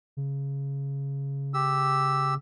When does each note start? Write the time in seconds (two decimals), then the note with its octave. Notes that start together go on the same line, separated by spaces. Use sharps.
0.17 C#3
1.54 G4 E6